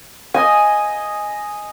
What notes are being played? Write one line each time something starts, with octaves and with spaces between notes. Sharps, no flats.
D#5 G#5